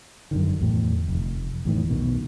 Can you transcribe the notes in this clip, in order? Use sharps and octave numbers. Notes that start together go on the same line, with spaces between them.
F#2 D3 D#3
E2 A2
F1
E2 A2 D#3
B1 B2 D#3